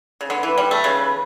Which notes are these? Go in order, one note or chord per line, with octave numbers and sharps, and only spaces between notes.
C#3
D3 B4
E3
G3
A3
C#3